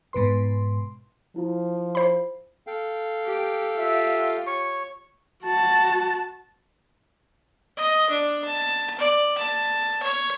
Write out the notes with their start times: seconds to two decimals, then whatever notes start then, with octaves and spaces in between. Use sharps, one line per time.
0.13 G#2 B2 B4 C6
1.36 F3 E4 F4
1.95 C5 B5
2.67 A4 F5 G5
3.26 G4
3.78 F4 G4 E5
4.47 C#5 C#6
5.44 F#4 A5
7.77 D#5
8.10 D4
8.44 A5
8.99 D5
9.38 A5
10.02 C#5